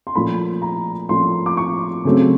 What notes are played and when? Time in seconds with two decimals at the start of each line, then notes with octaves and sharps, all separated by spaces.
0.07 C6
0.15 A#2 F3 A3 C#4 B5
0.62 A#5
1.09 A#2 F3 A3 C#4 C6
1.46 D6
1.57 C#6
2.05 C#3 F#3 A3 C4